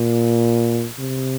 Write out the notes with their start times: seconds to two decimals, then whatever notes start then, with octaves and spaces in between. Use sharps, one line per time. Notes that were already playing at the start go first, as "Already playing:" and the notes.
Already playing: A#2
0.99 C3